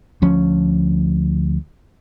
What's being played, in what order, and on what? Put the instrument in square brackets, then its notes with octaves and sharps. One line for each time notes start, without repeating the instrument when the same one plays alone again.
[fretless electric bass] D2 F3 C#4